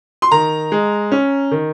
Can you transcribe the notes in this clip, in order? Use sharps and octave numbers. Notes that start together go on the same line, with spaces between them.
C6
D#3 A#5
G#3
C#4
D#3